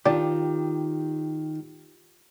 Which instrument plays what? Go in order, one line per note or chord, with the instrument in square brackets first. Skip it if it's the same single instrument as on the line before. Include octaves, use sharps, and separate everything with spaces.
[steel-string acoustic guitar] D#3 [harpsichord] D4 [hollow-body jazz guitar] F4 G4